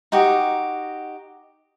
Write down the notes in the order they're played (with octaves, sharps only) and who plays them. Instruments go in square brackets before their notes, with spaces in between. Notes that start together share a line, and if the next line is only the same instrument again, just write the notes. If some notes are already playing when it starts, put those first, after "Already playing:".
[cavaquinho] D#4 F#4 G4